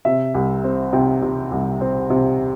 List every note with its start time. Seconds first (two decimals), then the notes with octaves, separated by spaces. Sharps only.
0.05 C3 E5
0.34 C2
0.64 C4
0.93 C3 G5
1.22 C3
1.52 C2
1.81 C4
2.10 C3